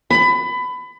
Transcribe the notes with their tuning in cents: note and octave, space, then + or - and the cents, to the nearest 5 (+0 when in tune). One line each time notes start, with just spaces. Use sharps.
B5 +25